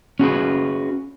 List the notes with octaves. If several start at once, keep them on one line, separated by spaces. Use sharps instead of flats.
C#4 F#4 G#4 B4